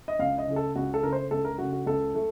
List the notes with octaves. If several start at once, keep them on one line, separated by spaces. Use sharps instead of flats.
D#5
C#2 F5
D#5
C#3 A3
A4
C#2 F#4
A4
C#3 A3 A#4
C5
C#2 A4
A#4
C#3 A3 F#4
F#4
C#2 A4
A3